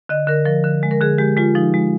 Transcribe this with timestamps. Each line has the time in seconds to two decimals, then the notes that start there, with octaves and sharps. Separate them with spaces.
0.09 D3 D#5
0.27 D3 A#4
0.46 F3 A#4
0.64 D3
0.83 G#3
0.91 A#4
1.01 D3 G#4
1.18 G#3 G4
1.37 G#3 F4
1.55 F3 D#4
1.74 G#3